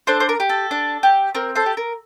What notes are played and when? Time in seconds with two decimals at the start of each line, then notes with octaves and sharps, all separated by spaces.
0.07 D4 A4 C5
0.20 C5
0.29 A#4
0.40 G4
0.49 A4
0.71 D4
1.03 G4
1.35 C4 A#4
1.55 A4 C5
1.66 G4
1.77 A#4